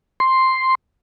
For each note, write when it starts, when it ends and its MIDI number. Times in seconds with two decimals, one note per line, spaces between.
0.20 0.75 84